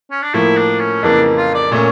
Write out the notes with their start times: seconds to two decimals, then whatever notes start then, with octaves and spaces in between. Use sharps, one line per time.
0.11 C#4
0.22 D4
0.34 A2 F3 A#3 E4
0.57 D4
0.79 C#4
1.03 F2 C#3 E3 A#3 D4
1.37 F4
1.54 D5
1.71 A#2 A3 C#4 C#5